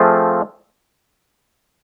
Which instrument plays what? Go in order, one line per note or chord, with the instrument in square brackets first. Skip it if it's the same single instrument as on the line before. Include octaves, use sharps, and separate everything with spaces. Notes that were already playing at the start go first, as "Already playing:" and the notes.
Already playing: [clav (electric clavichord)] F3 A3 C4 F4 G#4